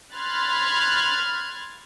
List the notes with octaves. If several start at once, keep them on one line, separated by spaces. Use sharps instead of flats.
B5 C6 F6 F#6 G#6 A6